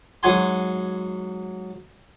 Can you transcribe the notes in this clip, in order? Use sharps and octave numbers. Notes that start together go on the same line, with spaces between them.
G#2 F#3 F#4 G#5 C6